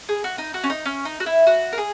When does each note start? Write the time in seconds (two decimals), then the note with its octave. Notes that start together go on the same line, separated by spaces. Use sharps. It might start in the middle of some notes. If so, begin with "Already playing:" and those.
0.09 G#4
0.24 F#4
0.38 D#4
0.54 F#4
0.63 C#4
0.70 D#4
0.86 C#4
1.05 D#4
1.20 F#4
1.26 E4
1.47 F#4
1.73 A#4
1.78 G#4